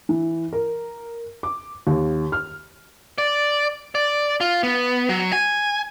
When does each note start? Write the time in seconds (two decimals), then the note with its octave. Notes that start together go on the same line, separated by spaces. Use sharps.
0.09 E3
0.53 A#4
1.43 D6
1.87 D#2
2.32 F6
3.18 D5
3.95 D5
4.41 F4
4.63 B3
5.09 F#3
5.32 G#5